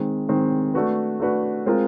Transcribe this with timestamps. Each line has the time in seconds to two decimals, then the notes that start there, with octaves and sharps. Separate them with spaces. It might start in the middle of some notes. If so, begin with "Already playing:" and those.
Already playing: D#3 G#3 C4
0.29 D#3 G#3 C4
0.74 A3 D4 F#4 B4
1.20 A3 D4 F#4 B4
1.66 G#3 C4 F4 A#4